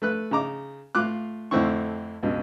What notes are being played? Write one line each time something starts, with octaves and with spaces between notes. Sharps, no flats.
A3 B4 F#6
C#3 D#4 A#5 D6
A2 F4 D6 F#6
F2 A2 D3 C4 E4 C#6
C#2 G2 B2